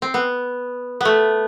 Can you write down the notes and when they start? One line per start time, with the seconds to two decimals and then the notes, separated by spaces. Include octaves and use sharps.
0.02 C4
0.14 B3
1.01 A3 B3